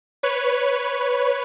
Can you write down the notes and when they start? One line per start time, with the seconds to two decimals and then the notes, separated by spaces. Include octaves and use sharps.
0.23 B4 C#5